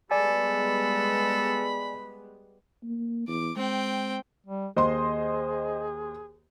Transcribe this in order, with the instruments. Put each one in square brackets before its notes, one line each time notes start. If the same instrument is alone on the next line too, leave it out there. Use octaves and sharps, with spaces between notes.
[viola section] G3 G#3 B3 [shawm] A4 [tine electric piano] D5 G#5 [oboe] B5
[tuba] A#3
[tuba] E2 [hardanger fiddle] D6
[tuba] G#3 [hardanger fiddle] C4 G5
[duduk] G3
[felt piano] D#2 C6 [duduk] G#4 [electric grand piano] C5 D#5